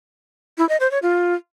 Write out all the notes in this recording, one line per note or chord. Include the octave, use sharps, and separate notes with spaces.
E4
D#5
C5
C#5
F4